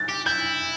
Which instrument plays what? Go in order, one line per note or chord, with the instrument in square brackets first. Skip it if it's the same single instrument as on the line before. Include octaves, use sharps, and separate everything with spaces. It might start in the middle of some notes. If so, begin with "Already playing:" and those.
Already playing: [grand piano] A6
[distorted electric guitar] G4
[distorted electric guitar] E4 [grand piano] G6